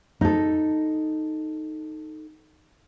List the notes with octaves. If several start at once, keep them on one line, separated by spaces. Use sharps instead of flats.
D#4 A4